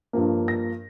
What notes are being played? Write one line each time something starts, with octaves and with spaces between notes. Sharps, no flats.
G2 F3 A#3
A#6